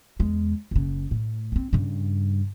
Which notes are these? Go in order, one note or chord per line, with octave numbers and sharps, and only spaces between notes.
E2 G#3
F#1 C#3
A2
B3 C4
G2 C#3